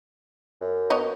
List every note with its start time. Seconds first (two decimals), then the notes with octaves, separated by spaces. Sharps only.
0.61 F#2
0.90 B3 C#5 D#5